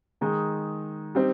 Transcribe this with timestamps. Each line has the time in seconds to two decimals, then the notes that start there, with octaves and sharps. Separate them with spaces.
0.21 D#3 G#3 D#4
1.15 G3 C4 D#4